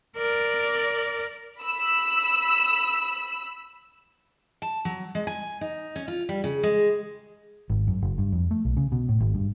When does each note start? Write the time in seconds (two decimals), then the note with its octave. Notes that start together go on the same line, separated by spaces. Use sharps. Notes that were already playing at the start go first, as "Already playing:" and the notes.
0.18 A#4 D5
1.60 B5 E6
4.62 A5
4.85 F#3
5.15 G#3
5.27 G#5
5.61 D#4
5.96 C#4
6.08 F4
6.29 G3
6.44 C#3
6.63 G#3
7.70 G#1
7.88 F#2
8.02 F#1
8.18 G2
8.32 F2
8.51 A3
8.65 B1
8.77 C#3
8.92 B2
9.09 A2
9.20 G#1
9.34 G2